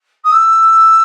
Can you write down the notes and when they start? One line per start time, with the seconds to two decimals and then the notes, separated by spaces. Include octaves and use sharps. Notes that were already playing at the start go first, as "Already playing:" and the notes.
0.24 D#6
0.32 E6